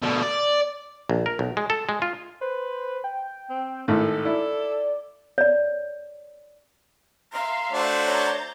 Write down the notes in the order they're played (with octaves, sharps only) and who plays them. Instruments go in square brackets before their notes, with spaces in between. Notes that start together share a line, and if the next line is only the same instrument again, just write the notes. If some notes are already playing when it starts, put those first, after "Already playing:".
[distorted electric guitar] B2 D3
D5
[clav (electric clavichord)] A#1
A#4
B1
G#3
A4
G#3
F4
[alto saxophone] B4 [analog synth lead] C5
[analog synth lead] G5
[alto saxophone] C4
[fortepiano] G#1 A2 [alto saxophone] A4
[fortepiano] E4 [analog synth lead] D5
[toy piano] C#5 D5
[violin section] E5 F5 C6 [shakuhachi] A#5
[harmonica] A3 D4 F#4 [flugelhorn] C5
[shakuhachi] C#5 [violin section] A#5 G6 A6